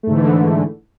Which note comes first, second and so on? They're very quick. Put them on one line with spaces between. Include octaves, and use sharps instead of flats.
A3 G#2 D3 E3